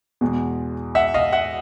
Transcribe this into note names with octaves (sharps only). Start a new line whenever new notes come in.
E2 B2 G#3
E5 F#5
D#5 F5
E5 F#5